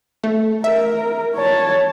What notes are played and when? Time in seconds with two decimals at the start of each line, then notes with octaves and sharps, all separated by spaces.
0.24 A3
0.64 A#4 E5
1.35 C#5 A5